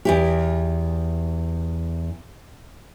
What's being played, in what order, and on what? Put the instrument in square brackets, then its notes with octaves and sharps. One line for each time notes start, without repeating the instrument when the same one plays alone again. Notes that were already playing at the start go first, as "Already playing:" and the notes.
[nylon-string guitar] E2 E4 G4